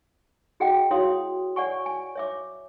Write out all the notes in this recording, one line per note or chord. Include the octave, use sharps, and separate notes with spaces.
F#4 G#4 D#5 F#5 G5
E4 F#4 C#5 F5 C6 D#6
C#5 D5 F#5 G#5 C#6
G#5
C#5 E5 D6